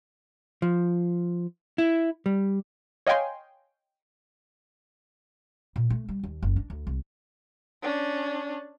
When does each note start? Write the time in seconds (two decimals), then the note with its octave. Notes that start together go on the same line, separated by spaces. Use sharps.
0.62 F3
1.78 E4
2.26 G3
3.07 C#5 D#5 F5 G5 G#5 C6
5.76 A#2
5.90 A3
6.08 G3
6.23 D#2
6.42 F#1
6.56 D4
6.70 D2
6.87 C2
7.82 C#4 D4